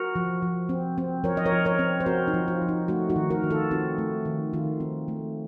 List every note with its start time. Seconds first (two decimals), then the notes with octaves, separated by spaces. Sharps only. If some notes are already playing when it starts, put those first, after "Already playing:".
Already playing: F#4 A#4
0.15 F3
0.42 F3
0.69 C4
0.98 C4
1.24 F3 A#4 C#5
1.37 D#5
1.46 A#4 C#5
1.52 F3
1.65 A#4 C#5
1.79 C4
2.00 C5
2.06 C4 F#4 A#4
2.28 D#4
2.34 F3
2.48 F4
2.62 F3
2.69 D#4
2.88 A3 D#4 F#4
3.10 D#4 F#4
3.16 D#3
3.30 F#4 A#4
3.44 D#3
3.50 F4 A4
3.71 C4 D#4 F#4
3.98 A3
4.25 D#3
4.53 D#3 F4
4.80 C4
5.08 A3